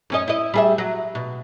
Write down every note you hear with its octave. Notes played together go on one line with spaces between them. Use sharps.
F#2 C#4 D#5
E4 D#5
G3 G#4 E5
F#3
B2